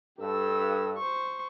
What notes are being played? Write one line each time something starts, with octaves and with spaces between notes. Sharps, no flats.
G2 G4 A4 E6
C5 C#6